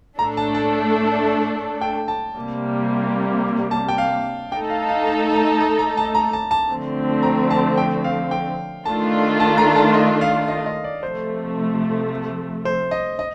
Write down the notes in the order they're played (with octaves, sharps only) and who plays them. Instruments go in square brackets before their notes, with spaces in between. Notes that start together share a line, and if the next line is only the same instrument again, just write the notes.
[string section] A2 A3 D4 A4 [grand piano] A#5
[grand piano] A5
A5
G5
A5
[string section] C3 G3 A#3
[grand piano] A5
G5
F5
[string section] A3 D#4 A4 [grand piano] G5
[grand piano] F5
F5
A5
A#5
A#5
A#5
A5
A#5
A5
A5
[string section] D3 F3 A3 C4
[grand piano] A#5
A5
G5
F5
G5
[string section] D#3 A3 D4 F4 [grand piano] A5
[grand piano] A5
A#5
A5
D#5
F5
D#5
D#5
D5
[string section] C3 F3 A3 [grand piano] C5
[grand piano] C5
D#5
D#5